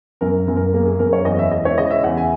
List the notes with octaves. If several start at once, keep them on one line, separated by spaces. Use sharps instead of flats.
F#2 A#4
F#2
A#4
A#3 A#4
G#4
F#2 A#4
C#5
E2 D#5
E5
G#3 D#5
C#5
C#3 D#5
E5
E2 F#5
G#5